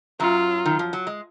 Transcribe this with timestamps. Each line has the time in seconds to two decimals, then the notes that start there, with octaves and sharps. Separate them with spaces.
0.20 F#2 F#3 F4
0.65 D#3
0.79 F3
0.93 F#3
1.07 G#3